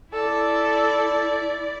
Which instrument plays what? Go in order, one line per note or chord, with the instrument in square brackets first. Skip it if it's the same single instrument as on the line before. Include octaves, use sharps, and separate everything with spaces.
[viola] E4 D5 [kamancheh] A4